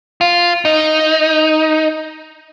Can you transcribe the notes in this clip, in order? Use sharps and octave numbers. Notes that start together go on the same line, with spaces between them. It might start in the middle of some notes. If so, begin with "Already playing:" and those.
F4
D#4